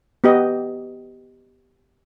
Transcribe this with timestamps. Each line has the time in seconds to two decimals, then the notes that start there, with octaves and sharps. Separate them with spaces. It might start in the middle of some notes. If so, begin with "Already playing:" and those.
0.24 B3 G4 D#5